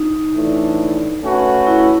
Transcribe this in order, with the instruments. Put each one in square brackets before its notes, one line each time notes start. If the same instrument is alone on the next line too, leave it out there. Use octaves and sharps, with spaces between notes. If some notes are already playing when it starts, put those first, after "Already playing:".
Already playing: [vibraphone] D#4
[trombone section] A2 E3 A3 D4
A3 C#4 F#4 B4
[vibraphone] E4